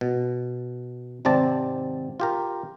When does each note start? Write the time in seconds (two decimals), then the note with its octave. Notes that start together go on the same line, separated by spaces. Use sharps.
0.01 B2
1.25 G#1 C3 C4 D5 A5
2.20 F4 G4 A#4